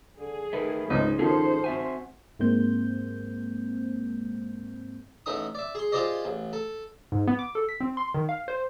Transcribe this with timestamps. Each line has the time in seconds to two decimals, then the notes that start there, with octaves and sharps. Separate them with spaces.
0.19 D3 G#4
0.53 D#3 A3 B4
0.90 C#2 G#2 C#3 D#4
1.19 D#3 F3 C#4 D#4 G#4 A4 C5
1.64 C4 F#4 E5 G#5
2.39 G#2 G#3 A#3 C4 C5 G6
5.26 A1 A3 D#4 D#6
5.55 D5 E5
5.75 G#4 C6
5.92 F4 G4 G#4 C5 D5 D#5
6.25 A1
6.53 A4
7.12 G#2
7.27 B3
7.39 D6
7.55 A4
7.69 B6
7.80 C4
7.97 C6
8.14 D#3
8.29 F5
8.48 C5